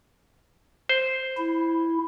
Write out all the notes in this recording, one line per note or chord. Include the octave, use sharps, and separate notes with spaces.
C5
E4